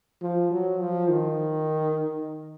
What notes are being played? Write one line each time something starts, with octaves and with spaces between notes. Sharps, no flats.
F3
F#3
F3
D#3